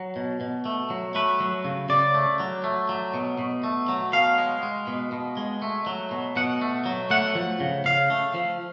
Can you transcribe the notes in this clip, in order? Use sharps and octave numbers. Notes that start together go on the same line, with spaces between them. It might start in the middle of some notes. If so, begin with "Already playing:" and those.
Already playing: F#3
B2
B2
A3
F#3
A3 B4
F#3
C#3
C#3 D5
A3
F#3
A3
F#3
B2
B2
A3
F#3
B2 F5
G#3
G#3
B2
B2
G#3
A3
F#3
B2
B2 F#5
A3
F#3
A3 F#5
F3
C#3
C#3 F5
A3
F3